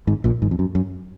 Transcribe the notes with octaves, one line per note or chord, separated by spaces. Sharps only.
G#1 G#2
A#1 A#2
G#1 G#2
F2
F#2
F#2